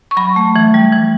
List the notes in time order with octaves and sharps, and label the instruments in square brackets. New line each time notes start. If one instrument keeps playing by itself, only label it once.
[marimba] C#6
F#3 B5
A3
E3
G3
E3